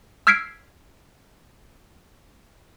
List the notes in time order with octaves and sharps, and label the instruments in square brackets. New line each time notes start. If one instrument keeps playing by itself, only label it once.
[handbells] E6 F6 G#6 B6 C7 D7